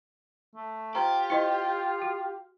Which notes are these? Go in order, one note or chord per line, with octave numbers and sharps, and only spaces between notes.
A3
F4 G4 C5 A#5
E4 C5 D#5
F#4